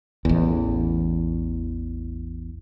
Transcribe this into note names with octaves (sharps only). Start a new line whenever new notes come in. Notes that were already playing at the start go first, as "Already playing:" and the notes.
A1 E2